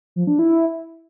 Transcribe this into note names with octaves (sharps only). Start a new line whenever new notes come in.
F3
D4
E4